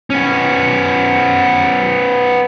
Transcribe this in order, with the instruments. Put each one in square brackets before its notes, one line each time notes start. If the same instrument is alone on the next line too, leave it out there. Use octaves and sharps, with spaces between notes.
[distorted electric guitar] B3 C#4